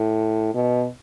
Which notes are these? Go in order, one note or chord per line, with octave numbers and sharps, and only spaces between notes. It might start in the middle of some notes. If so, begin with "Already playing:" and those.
Already playing: A2
B2